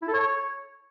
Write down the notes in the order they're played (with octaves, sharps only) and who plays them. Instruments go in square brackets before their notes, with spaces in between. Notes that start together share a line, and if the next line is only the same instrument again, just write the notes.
[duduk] E4
A4
C#5